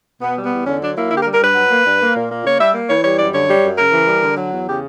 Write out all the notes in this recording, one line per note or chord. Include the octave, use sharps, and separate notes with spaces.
B2 B3
G3
B3
E2
D3 C#4
F#3 D4
A#3 E4
D3 E4
G4
A#4
G3
A#4
G2 B4
F#3
A#3
G2
A#3
A#2
A#3
C#3 C#5
G3 E5
A#3
E3 C#5
G3 C#5
F#2 D5
D3 C#5
G3
F#2
C#3 A#4
E3
G3
D3
F#3
E2
C#3 G4